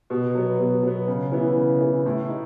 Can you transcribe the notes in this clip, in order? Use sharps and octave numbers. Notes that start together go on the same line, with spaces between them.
B2
F#3 B3
B2
F#3 B3
C#3
E3 B3 E4
C#3
E3 B3 E4
A2
D#4